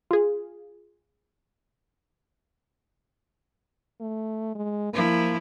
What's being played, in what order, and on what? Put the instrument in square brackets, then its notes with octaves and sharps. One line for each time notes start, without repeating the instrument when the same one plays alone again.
[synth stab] F4 G#4
[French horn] A3
G#3
[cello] F3 E4 [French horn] A#3